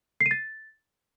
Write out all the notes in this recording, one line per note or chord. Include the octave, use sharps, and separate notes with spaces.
C7
D#7
A6